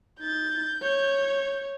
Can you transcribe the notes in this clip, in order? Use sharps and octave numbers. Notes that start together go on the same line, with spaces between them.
D#4 G6 A6
C#5